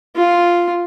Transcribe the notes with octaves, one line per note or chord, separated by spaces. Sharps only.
F4